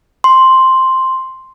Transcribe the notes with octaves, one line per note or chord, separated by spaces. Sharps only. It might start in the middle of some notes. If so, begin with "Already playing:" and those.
C6